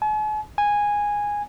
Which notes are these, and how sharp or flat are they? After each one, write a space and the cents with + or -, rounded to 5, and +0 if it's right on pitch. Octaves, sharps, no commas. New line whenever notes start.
G#5 +45
G#5 -10